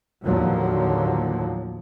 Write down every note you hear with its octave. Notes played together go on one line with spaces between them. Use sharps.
D#2 A2 D3 F3 F#3